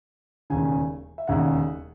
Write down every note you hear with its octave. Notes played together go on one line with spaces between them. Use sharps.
E1 D#2 C#3 G#5
E5
E1 D#2 C#3 F#5